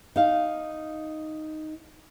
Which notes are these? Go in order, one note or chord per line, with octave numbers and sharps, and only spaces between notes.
D#4 F5